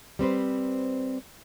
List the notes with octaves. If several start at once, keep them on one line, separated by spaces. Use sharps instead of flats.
G3 C4 B4 C5